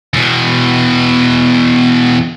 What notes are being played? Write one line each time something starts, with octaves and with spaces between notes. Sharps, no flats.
E2 B2